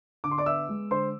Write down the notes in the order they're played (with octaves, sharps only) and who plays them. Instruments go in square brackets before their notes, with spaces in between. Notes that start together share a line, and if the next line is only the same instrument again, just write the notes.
[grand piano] D3 D6
C6
D5 D6
B3 E5 E6
G#3
D3 C5 C6